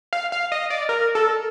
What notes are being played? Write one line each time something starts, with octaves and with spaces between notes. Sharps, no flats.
F5
F5
D#5
D5
A#4
A4